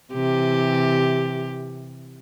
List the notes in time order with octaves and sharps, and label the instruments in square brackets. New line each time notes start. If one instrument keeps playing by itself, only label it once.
[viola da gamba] C3 E3 G4